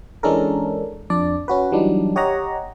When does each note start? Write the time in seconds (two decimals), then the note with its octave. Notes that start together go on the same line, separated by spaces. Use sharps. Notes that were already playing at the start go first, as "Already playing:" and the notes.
0.23 E3 G#3 C#4 D4 A4 A#4
1.10 F2 D4 D5
1.48 C#4 F#4 B4
1.72 E3 F#3 G3 D4 D#4
2.16 G4 C#5 D#5 F#5 A#5